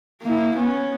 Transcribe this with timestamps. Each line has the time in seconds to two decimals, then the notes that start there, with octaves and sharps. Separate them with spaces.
0.22 A#3 E4
0.55 B3 C#4